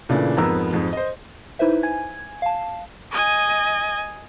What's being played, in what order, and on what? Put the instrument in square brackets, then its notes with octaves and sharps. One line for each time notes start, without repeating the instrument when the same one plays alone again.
[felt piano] A#2 C#3 E3 A3 D4
F2 G#2 B3 A#4 A#5 E6
F2 G#2
C5 D#5
[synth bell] D#4 E4 B4 C5 E5
G#5 G#6
F5 A5
[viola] D#5 G#5